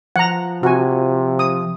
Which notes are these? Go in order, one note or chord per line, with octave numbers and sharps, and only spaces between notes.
F3 F#5 A#5
C3 F#4 G#5
D#6